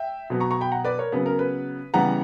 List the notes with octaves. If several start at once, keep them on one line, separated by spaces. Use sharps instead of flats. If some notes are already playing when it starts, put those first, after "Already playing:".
Already playing: E5 G5
B2 F#3 B3
A#5 C#6
A#5 C#6
G5 B5
F#5 A#5
B4 D5
A#4 C#5
C#3 F#3 B3 B4
A#4
B4
C#3 E3 G3 B3 F#5 A#5